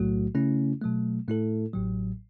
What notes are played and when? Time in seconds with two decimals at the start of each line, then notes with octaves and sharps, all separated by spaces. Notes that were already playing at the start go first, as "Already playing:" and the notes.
Already playing: B1 A2 F#3 A3 F#4
0.35 C#3 A3 C#4 E4
0.81 B2 F#3 A3
1.28 A2 A3 E4 A4
1.74 A1 A2 F#3